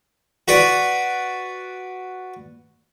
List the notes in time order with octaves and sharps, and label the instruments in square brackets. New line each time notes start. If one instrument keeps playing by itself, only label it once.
[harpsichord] F#4 B4 D5